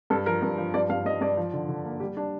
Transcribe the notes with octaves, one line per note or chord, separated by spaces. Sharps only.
G2 A4
F3 A#4
G2
F3
G2 D5
G2 F5
G2 D#5
G2 D5
F3
D3
D3
A#3
G3 G4
G3 D4